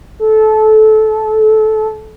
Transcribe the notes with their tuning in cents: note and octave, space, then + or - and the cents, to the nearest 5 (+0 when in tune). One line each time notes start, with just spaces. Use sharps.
A4 -20